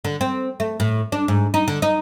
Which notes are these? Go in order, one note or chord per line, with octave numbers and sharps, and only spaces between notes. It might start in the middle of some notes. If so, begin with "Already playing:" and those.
D3
C4
A3
A2
D4
G#2
D#4
D3
D#4